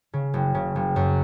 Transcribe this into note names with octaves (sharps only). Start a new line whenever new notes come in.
C#3
F#1
C#3
F#1
F#2